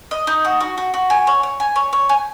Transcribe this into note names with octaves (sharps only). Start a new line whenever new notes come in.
D#5
D#4
F#4
F#4
F#4
F#4
G#5
C#5
C#5
G#5
C#5
C#5
G#5